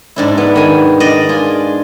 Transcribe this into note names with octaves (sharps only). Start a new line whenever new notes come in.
G#2 D4 E4
B3
D#3 G#5
D4 D5 D#5
F4 G#4